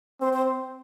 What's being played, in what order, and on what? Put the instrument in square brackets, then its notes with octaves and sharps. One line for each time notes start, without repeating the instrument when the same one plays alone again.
[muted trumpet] C4 [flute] C5
[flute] C5